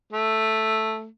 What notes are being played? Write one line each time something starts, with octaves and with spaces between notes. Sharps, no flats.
A3